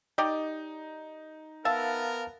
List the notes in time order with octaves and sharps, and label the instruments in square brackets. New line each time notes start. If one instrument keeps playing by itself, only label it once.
[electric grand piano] D#4 [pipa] G4 D5 D#5
[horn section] B3 A#4 [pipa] E5 [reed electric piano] F5 A5 A6